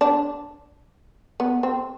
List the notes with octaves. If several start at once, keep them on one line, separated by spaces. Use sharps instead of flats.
D4
B3
C4